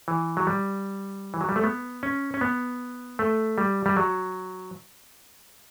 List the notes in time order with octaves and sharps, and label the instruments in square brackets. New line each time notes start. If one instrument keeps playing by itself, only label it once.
[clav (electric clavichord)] E3
F#3
G3
E3
F#3
G3
A3
B3
C#4
C#4
B3
A3
G3
G3
F#3